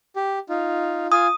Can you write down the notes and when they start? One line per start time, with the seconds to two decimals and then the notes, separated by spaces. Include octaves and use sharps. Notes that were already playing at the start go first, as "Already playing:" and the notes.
0.16 G4
0.49 D#4 F4
1.12 F4 G#5 D#6